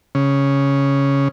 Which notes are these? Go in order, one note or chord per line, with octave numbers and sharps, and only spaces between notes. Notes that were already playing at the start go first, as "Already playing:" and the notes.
C#3